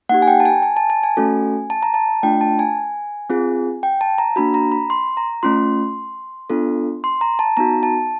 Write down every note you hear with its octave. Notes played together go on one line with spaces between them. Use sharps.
A#3 D#4 G4 F#5
G#5
G5
A5
G#5
G#5
A5
A5
G#5
A3 C#4 F#4 A4
A5
A#5
A5
A3 D4 F4 G5
A5
G#5
C4 F4 G#4
G5
A5
A#5
A#3 D4 F#4 B5
A#5
B5
C6
A#5
A3 C#4 F4 C6
B3 D4 F4 A4
C6
A#5
A5
B3 D#4 F#4 A#5
A5